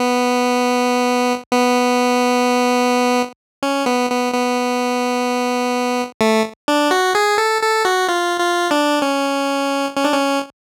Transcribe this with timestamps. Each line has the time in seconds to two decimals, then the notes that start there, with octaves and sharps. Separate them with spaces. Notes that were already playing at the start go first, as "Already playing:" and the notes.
Already playing: B3
1.53 B3
3.63 C#4
3.86 B3
4.10 B3
4.33 B3
6.21 A3
6.68 D4
6.91 F#4
7.15 G#4
7.38 A4
7.62 A4
7.85 F#4
8.09 F4
8.40 F4
8.71 D4
9.02 C#4
9.96 C#4
10.04 D4
10.13 C#4